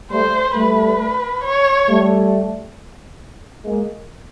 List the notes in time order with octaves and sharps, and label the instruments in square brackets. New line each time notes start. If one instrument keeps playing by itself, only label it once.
[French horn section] G3 A3 [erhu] C5
[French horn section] G3 A3 [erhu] B4
[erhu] C#5
[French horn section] G3 A3
G#3 A#3